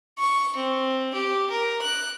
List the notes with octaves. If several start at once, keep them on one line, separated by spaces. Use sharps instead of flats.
C#6
C4
G4
A#4
F#6